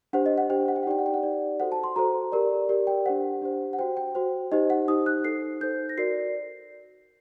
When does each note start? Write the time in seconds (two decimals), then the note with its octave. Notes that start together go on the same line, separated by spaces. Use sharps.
0.13 D4 G4 C5 F#5
0.26 D#5
0.38 F#5
0.50 D4 G4 C5 G5
0.68 F#5
0.76 G5
0.83 F#5
0.86 D#4 G4 D5 G5
0.99 F#5
1.06 G5
1.14 F#5
1.23 D#4 G4 D5
1.60 F#4 A4 C5 F#5
1.72 A5
1.84 C6
1.96 F#4 A4 C5 A#5
2.32 G4 A#4 D5
2.69 G4 A#4 D5
2.87 G5
3.06 D4 G4 C5 F#5
3.42 D4 G4 C5
3.73 F#5
3.79 F#4 C5 G5
3.97 G5
4.15 F#4 C5
4.52 D#4 G4 C5 D#5
4.70 F#5
4.88 D#4 G4 C5 D#6
5.06 F#6
5.24 D#4 A4 C5 C7
5.61 D#4 A4 C5 G6
5.89 A#6
5.98 F#4 A#4 D5 C7